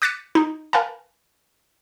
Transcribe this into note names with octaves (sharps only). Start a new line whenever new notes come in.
D6 F#6 A6 B6 C#7 D#7
D#4
A#4 B4 F5 G#5 A5